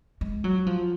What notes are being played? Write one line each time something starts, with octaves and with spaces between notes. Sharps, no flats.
G#3
F#3
F3